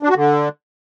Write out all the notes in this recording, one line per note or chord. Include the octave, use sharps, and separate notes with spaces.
D4
F#4
D3